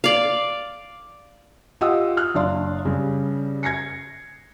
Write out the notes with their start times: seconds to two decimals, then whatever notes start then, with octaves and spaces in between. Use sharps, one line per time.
0.04 D5 F5
1.81 F4 G4 D#5 F#5 D#6 E6
2.17 F6 F#6
2.35 F#1 D4 F5 C6
2.85 G2 C#3
3.63 G#6 A#6 C7 C#7